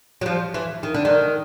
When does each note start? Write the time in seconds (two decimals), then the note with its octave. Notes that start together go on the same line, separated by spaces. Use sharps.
0.21 F#3
0.26 F3
0.54 E3
0.83 D#3
0.94 D3
1.05 D#3